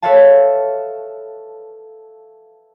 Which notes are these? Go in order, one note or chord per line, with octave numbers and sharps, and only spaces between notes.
A4 B4 C#5 E5 F5 A5